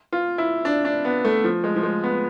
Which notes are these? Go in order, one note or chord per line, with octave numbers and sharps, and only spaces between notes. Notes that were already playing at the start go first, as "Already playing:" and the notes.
F4
E4
D4
D4
B3
A3
F3
G#3
F3
G#3
B3